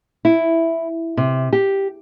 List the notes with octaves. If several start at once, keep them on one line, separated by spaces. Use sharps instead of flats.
E4
C3
G4